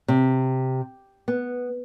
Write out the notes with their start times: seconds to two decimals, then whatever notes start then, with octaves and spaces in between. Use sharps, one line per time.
0.08 C3
1.28 B3